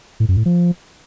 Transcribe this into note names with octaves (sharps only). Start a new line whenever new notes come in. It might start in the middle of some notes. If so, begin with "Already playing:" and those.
A2
F#2
A2
F3